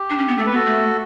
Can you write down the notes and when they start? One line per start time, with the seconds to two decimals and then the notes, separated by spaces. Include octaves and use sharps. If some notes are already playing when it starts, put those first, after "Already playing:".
Already playing: G4
0.10 D4
0.18 C#4
0.28 B3
0.38 A3 A4
0.46 B4
0.51 B3
0.55 F#4 A4
0.66 A3